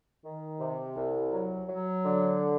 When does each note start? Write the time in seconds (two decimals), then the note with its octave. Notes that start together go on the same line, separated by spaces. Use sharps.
0.24 D#3
0.59 C3
0.96 C2
1.32 F#3
1.68 F#3
2.05 D3